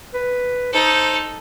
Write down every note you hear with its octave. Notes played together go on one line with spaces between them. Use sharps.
B4
D#4 A4 C5